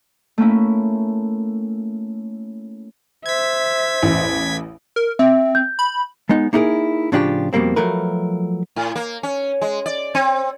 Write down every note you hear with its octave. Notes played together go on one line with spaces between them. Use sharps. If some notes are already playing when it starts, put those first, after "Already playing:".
A3 A#3 C#4 E4
C5 E5 G#6 B6
A1 E2
A#4
C4 E5
G6
B5
G#3 B3 D#4
A#3 D#4 E4 F#4 G#4 A#4
A2 C#3 F3 D4 F4 G4
F2 B2 G3 A#3 C4
F3 F#3 A3 A#4 B4
A2
A#3
C#4
G#3
D5
C4